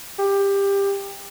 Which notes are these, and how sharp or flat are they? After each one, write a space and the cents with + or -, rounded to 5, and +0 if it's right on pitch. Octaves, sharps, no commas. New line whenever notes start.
G4 +20